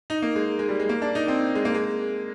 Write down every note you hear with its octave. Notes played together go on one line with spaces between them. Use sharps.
D#4
A#3
G#3
G#3
G3
G#3
A#3
D4
D#4
C4
G#3
A#3
G#3